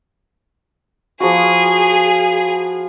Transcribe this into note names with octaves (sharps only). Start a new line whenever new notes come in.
F3 B3 F#4 G#4